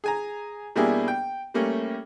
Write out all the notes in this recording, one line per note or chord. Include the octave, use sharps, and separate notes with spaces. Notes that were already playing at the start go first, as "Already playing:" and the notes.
G#4 G#5 A#5
B2 G3 A#3 D4 E4 G#4
G5
G3 A3 A#3 C#4